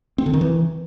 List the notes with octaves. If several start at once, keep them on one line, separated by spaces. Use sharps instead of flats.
C4
D3
D#3
E3